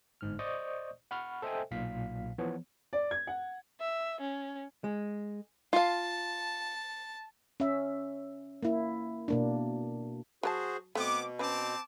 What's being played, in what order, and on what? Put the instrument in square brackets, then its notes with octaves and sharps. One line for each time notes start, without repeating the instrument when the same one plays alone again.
[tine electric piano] G1 G#2 F6
C5 D5 D#5 C#6 D#6 G6
F#5 B5 C#6 F6
A4 C5 D#5 E5 G5 G#5
B1 A#2 F5 B6
E3 F3 B3 C#5
[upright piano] D5
G#6
F#5
[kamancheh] E5
C#4
[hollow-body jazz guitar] G#3
[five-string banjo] F4 F5 [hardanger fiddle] A5
[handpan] C#4 E5
A#3 E4
B2 A#3 D4
[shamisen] F#3 A#4 A5 [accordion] F#4 G#4 C5
[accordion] B2 [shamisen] A3 C4 [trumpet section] B3 D6
[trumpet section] C4 A5 D6 [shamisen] C#4 B4